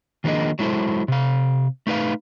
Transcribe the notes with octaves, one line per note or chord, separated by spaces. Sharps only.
D#3 F3 A#3 D4 G#4 D#5
F#3 G#3 E4 A4 C5
C3 F5
A3 D#4 B4 F5